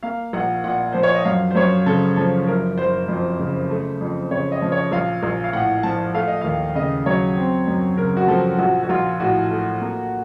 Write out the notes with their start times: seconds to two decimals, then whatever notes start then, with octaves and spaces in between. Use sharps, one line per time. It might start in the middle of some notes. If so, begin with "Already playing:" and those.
0.03 A#3 F5
0.33 A#1 F#5
0.64 A#2 F#5
0.93 F3 C5
1.03 C#5
1.14 D#5
1.25 F#2 F5
1.51 C5
1.55 F#2 C#5
1.86 C#3 A4
2.17 F3 A4
2.47 F#1 A#4
2.78 F#1 C5
3.08 F2
3.39 C#3
3.70 A3
4.01 F2
4.31 C#3 C#5
4.52 D#5
4.62 F3
4.72 C#5
4.92 A#1 F5
5.23 A#1
5.44 F5
5.53 A2 F#5
5.83 F3 A5
6.14 A3 F5
6.28 D#5
6.41 D#2 F5
6.75 C#3 D#5
7.06 F#3 C#5
7.37 C4
7.67 F#2
7.97 C#3 A#4
8.17 F#4
8.28 F3 A4
8.58 A#1 F#4
8.83 F#4
8.89 A#1 F4
9.20 A2 F#4
9.51 A3
9.81 A#3